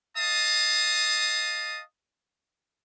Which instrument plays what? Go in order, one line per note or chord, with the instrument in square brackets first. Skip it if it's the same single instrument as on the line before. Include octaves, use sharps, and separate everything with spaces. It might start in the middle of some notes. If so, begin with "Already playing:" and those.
[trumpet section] D#5 F5 A5 D#6